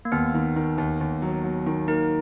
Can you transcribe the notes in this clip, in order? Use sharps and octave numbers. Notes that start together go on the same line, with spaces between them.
A#3
D#2 B3
D#3
D#3
D#2
D#2
F#3
F#3
D#3
A#3 D#4